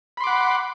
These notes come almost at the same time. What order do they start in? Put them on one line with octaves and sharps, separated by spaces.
B5 C6 D6 F#5